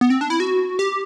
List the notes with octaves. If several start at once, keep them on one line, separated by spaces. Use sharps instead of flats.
B3
C4
D4
E4
F#4
G4